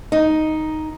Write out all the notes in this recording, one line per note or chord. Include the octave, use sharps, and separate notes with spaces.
D#4